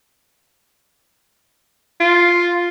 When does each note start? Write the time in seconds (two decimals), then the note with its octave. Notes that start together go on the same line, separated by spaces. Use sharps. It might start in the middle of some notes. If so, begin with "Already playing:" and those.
2.00 F4